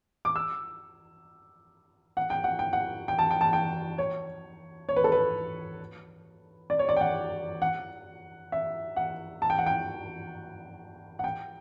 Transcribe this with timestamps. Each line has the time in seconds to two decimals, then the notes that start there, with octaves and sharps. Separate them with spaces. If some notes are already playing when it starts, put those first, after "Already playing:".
0.25 D6
0.36 E6
2.17 F#5
2.30 G5
2.44 F#5
2.59 G5
2.73 F#5
3.08 G5
3.19 A5
3.31 G5
3.41 A5
3.53 G5
3.98 C#5
4.89 C#5
4.96 B4
5.04 A4
5.12 B4
6.70 D5
6.79 C#5
6.89 D5
6.97 G5
7.01 F#5
7.62 F#5
8.52 E5
8.96 F#5
9.42 A5
9.50 G5
9.58 F#5
9.66 G5
11.19 F#5
11.24 G5